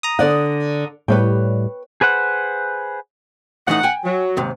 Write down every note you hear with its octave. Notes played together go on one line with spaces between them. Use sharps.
A#5 D#6
D3 D5 F#5
A2 G3 B4 C#5 G5
G#4 B4 C5 F#5
A2 E3 D#4 F#5
G5 G#5
F#3
D#2 G#2 C3